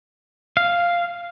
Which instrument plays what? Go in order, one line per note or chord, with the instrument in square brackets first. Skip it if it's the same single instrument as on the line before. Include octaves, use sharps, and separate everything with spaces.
[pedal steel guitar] F5